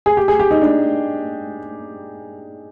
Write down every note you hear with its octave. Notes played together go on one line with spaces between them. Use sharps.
G#4
G4
G#4
G4
D#4
D4